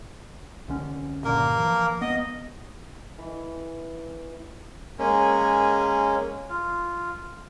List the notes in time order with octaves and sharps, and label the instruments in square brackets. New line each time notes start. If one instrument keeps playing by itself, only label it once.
[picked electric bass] C2 D3 C#4
[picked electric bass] G2 A#2 D3 [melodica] A#3 A#4
[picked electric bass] E3 F3
[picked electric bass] B3 [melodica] D#5
[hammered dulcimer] E3
[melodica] G#3 A#3 C#4
F4